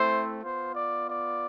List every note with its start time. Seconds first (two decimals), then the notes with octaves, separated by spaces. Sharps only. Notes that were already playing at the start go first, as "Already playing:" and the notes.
Already playing: A3 C4 E4 C5
0.42 B3 F4 C5
0.75 D5
1.09 D5